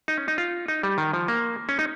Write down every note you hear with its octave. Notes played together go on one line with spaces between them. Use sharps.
D#4
C#4
D#4
F4
D#4
G3
D#3
F3
A#3
C#4
D#4